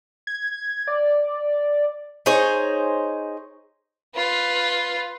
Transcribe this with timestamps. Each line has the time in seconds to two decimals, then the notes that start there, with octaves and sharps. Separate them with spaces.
0.27 G#6
0.88 D5
2.26 D#4 G#4 C5 C#5
4.15 F4 B4